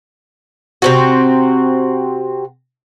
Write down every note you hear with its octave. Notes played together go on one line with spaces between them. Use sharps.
C3 C4 F#4